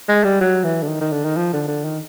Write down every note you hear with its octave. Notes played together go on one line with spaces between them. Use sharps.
G#3
G3
F#3
E3
D3
D#3
D#3
D3
D#3
F3
D3
D3
D#3